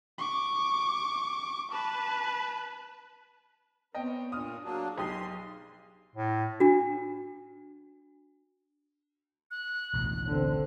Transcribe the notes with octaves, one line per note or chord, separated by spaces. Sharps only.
C#6 D6
B4 A5
B3 C4 C#5 D#5 G5
A#2 D4 D#6 F6
F#3 A#3 D4 F#4 G#4
B1 G4 C6 D#6
A2
D4 F#4
F#6
E1 A1 D2
D3 C4